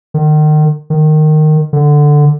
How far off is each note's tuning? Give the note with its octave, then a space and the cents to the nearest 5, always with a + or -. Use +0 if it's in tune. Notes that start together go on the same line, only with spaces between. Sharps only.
D#3 -35
D#3 -15
D3 +5